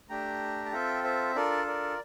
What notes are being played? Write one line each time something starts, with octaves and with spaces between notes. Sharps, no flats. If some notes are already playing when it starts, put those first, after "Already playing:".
A3 D4 G4 G5 A#5
A5
C4 F4 A4 E5 G5
C5 E5
D4 F4 A4 A#4 D5
A#4 D5